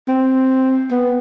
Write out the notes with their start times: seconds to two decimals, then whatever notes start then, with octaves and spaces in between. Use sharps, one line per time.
0.08 C4
0.91 B3